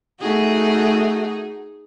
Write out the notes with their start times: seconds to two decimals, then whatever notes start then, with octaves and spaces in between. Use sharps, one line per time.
0.21 A3 D#4 F#4 G#4